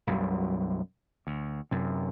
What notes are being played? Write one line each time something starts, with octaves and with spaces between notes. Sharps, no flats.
B1 F#2 B2 G3
D2
F#2 C3